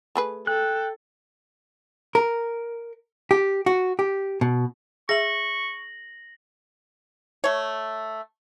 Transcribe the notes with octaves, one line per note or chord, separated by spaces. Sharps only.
A3 G#4 B4
A4 G5 F#6
A#4
G4
F#4
G4
B2
G#4 E5 C#6 A#6 F#7
A3 C#5